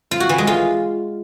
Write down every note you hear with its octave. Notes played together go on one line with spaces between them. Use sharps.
F4
F#4
E3
G#3
F4